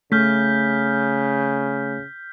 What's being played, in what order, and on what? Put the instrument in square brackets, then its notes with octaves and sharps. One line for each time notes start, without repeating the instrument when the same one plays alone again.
[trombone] C#3 [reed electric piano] A3 [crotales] F6 G6 B6